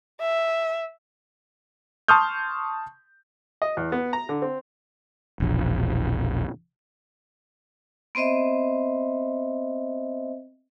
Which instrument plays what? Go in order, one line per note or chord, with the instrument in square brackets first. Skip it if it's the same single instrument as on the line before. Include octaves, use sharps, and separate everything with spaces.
[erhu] E5
[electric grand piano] A5 C6 C#6 D#6 F6 G6
[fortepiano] D#5
E2
B3
A#5
D3
C4
[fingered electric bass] E1 A#1
[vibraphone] B3 C4 C5 D#5 E5